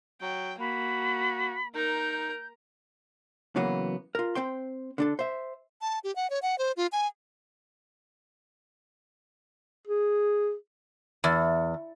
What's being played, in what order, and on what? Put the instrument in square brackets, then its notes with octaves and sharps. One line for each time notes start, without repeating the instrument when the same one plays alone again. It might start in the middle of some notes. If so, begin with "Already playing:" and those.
[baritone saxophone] F#3 [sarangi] G5
[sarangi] A#3 [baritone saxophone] F#4 [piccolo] B5
[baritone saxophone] D#4 [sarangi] A#4 [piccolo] G6
[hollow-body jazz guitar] C#3 E3 F#3 A#3 B3
F4 A#4
C4 C5 G5 C6
D3 D4 A4
C5 E5
[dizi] A5
G4
F#5
C#5
F#5
C5
F4
G#5
[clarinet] G#4
[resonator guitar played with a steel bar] E2